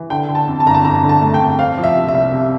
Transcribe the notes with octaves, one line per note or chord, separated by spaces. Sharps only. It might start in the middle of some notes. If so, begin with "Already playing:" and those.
Already playing: E3
D3 G5
D3
A5
F2
A5
G1 A#5
A5
F2 A#5
D3
A5
A3
G5
F2
C4 F5
F3
E5
C3
E5
C2
C3